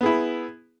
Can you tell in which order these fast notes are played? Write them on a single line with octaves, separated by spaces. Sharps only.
B3 G#4 E4